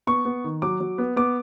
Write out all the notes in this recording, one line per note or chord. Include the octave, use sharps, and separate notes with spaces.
B3 C#6
B3
D#3
F#3 D6
F#3
B3
B3 D6